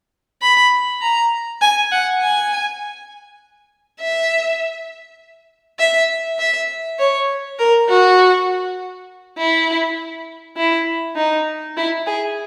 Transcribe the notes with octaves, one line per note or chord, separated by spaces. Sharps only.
B5
A#5
G#5
F#5
G#5
E5
E5
E5
C#5
A#4
F#4
E4
E4
D#4
E4
G#4